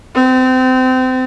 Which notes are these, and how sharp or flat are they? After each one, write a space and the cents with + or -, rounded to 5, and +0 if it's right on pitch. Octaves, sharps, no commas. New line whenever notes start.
C4 -30